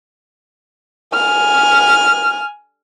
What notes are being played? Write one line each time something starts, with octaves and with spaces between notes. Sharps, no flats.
G#5 F6